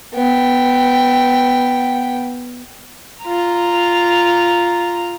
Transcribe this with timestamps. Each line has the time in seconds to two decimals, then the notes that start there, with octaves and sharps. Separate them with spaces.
0.14 B3 G5
3.25 F4 A#5